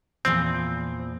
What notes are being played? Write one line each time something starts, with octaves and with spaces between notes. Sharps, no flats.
E2 A#2 F3 C4